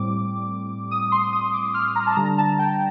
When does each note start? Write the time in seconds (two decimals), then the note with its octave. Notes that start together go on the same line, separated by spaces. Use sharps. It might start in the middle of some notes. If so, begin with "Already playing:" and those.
Already playing: A2 G3 C4 D6
0.91 D#6
1.12 C6
1.33 D#6
1.54 D6
1.74 F6
1.96 A#5
2.07 A5
2.16 D3 G3 D4 A#5
2.38 A5
2.59 G5